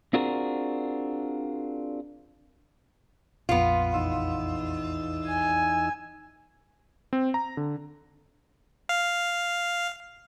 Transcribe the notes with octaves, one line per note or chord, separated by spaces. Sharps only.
C4 D4 F4 F#4 G#4 A#4
A#1 F2 B3 F4
E2 D#4 E6
G#5
C4
A#5
D3
F5